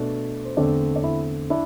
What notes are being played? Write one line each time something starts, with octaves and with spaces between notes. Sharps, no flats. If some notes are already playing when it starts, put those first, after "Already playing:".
Already playing: B2 A3 D4
C5
E2 D3 A3 C4 D4 D5
D5
E4 E5
D4 E4 E5